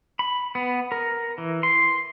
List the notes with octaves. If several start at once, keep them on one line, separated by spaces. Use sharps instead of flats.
B5
B3
A#4
E3
C6